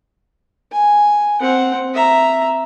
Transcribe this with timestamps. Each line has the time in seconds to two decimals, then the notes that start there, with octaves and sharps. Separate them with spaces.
0.72 G#5
1.40 C4 F#5
1.94 E5 A#5